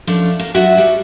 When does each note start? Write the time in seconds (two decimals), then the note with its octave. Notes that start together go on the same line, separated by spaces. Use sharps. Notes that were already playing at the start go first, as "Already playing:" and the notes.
0.07 F3 A3 C#4 D4
0.40 A#3
0.54 F#3 D4 F4 F#4 E5
0.77 G3 F#4